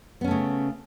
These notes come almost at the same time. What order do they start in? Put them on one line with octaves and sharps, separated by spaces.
B3 C#4 A3 C#3